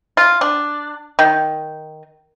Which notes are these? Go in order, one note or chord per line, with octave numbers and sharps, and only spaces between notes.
F4
D4
D#3